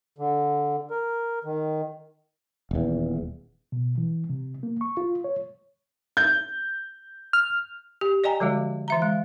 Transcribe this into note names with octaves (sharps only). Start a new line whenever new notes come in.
D3
A#4
D#3
D#1 E2
B2
E3
C3
A#3
C#6
F4
C#5
G6
F6
G4
D5 D#5 G5 G#5 A#5
D3 F3 G3 G#3 F#4
E3 E5 A#5
G#3